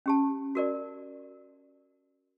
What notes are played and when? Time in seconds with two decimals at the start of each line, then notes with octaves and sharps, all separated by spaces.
0.06 C#4 G4 A5
0.55 F#4 A#4 D5